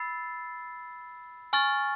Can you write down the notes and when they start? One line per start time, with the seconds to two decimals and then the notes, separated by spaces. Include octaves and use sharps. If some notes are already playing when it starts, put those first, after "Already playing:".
Already playing: B5 E6 A6 C7
1.53 G#5 C#6 F6 A6